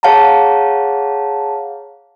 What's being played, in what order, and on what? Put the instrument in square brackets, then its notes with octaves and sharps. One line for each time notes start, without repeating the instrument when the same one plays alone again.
[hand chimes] G#4 C#5 F5 F#5 A5 A#5